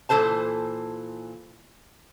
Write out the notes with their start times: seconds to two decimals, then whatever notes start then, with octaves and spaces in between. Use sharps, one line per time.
0.09 A#2 E3 A4 C5 A5